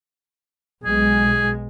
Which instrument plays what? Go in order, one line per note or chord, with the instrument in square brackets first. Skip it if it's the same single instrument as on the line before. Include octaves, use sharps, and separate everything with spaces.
[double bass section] B1 G#3 [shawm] G#4